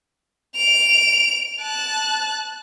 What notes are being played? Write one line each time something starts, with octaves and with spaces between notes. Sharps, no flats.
D7 F7
A5 F#6